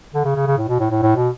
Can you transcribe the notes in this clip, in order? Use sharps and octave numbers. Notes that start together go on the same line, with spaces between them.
D3
C#3
C#3
C#3
A2
B2
A2
A2
A2
B2